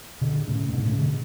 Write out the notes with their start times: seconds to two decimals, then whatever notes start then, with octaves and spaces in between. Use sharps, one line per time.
0.21 B2 D3
0.40 B2
0.47 A2 C#3
0.69 A2
0.72 G#2 B2
0.86 A2 C#3
0.98 B2 D3